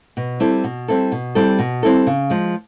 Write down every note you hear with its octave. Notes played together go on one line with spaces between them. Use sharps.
B2
G3 C4 E4 A4
B2
G3 C4 E4 A4
B2
G3 C4 E4 A4
B2
G3 C4 E4 A4
C#3
F3 G#3